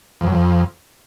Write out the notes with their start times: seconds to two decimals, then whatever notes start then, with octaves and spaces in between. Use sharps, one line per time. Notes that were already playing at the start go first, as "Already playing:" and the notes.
0.21 F2
0.27 F#2
0.32 F2